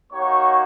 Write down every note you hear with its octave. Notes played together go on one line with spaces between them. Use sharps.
A#3 D#4 F#4 C#5 C#6